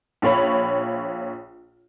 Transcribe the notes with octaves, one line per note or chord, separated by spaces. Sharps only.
A#1 F4 C#5 B5